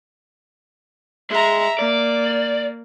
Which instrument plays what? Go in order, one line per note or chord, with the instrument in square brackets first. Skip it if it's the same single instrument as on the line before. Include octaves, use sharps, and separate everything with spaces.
[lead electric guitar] G#3 G#4 [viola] E5 A#5
[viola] A#3 [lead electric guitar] D5